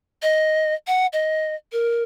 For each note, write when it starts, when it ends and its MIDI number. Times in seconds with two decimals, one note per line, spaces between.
0.22 0.74 75
0.87 1.06 78
1.13 1.55 75
1.72 2.03 70